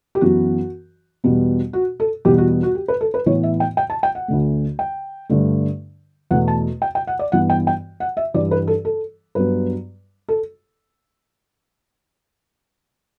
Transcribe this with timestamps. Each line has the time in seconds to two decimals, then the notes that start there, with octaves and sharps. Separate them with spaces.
0.15 G4
0.21 F#2 E3 B3 F#4
1.24 E2 B2 G3 B3
1.73 F#4
2.00 A4
2.25 E2 B2 G3 B3 G4
2.38 F#4
2.63 F#4
2.75 G4
2.88 B4
3.01 A4
3.14 B4
3.26 A2 E3 B3 C#5
3.43 E5
3.60 G5
3.77 G5
3.90 A5
4.03 G5
4.15 F#5
4.28 D2 D3 A3
4.79 G5
5.29 G2 D3 A3
6.31 E2 B2 A3 F#5
6.48 A5
6.82 G5
6.95 G5
7.07 F#5
7.19 D5
7.32 G2 E3 B3 F#5
7.50 G5
7.67 G5
8.00 F#5
8.17 E5
8.34 G2 E3 G3 D5
8.51 B4
8.67 A4
8.85 A4
9.35 G2 F#3 B3 B4
10.28 A4